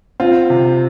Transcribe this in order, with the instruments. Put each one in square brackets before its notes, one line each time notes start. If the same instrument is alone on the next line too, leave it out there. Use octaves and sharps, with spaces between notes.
[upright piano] C4 F4
C3